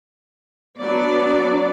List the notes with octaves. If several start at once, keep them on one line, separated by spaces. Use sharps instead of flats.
F#3 B3 D4 D5